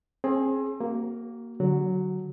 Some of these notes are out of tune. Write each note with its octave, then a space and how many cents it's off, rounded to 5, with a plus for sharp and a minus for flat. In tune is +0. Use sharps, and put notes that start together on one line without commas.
C4 +35 G#4 +15
A#3 +0 F#4 +30
D3 -10 F#3 +0 F#4 +0